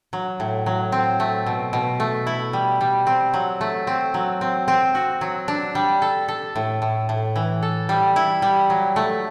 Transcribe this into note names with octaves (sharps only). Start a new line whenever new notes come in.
F#3
A2
F#3
C4
A3
B2
B2
A3
E4
G3
G3
C4
F#3
A3
C4
F#3
C4
C4
F#4
F#3
D4
G3
A4
A4
A2
A2
A2
E3
A4
G3
E4
G3
F#3
A3